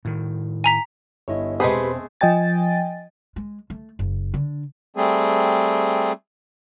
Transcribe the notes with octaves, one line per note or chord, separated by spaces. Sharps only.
A2 D#3
G#5 A#5 B6
G1 E4 C#5 D#5
E1 G#3 A3 C4 G4 G#4 B4 B5
F3 D#5 G5 G#5 A6
G#3
A3
F#1
D3
G3 A3 C4 G#4